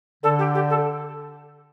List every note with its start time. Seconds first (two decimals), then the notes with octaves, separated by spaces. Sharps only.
0.23 D3 A4
0.39 G4
0.55 G4
0.70 A4